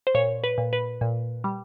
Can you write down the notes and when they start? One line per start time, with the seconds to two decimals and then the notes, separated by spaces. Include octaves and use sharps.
0.07 C5
0.15 A#2 C#5
0.44 B4
0.58 A#2
0.73 B4
1.01 A#2
1.44 G3